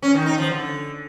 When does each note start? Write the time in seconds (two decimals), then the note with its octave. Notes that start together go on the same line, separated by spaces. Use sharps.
0.02 C#4
0.14 D#3
0.26 D#4
0.38 F3
0.50 D3